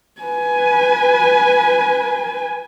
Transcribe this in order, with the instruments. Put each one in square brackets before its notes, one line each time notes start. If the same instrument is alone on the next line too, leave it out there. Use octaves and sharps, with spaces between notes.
[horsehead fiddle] B4 G#5